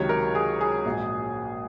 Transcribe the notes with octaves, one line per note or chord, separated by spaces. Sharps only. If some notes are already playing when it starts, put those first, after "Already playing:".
Already playing: C#2 C3 D#3 F#3 C#5
A#4
G#4
G#4
A#1 G#2 F#3